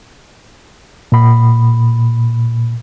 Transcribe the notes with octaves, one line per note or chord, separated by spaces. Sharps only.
A#2 B5